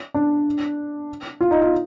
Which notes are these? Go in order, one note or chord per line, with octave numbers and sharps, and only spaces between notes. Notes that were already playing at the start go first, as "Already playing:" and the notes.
D4
F4
D#4
F4